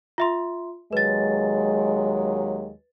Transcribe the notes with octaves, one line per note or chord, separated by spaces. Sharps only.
F4 E5 C6
D#2 F#3 G#3 B4 A6